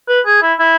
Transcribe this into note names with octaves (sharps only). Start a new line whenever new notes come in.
B4
G#4
E4
E4